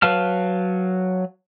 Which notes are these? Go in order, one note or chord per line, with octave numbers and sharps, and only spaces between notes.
F#3 B4 F5 A5 F6